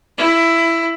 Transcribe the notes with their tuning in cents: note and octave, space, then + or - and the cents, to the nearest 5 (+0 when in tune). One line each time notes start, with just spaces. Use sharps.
E4 +10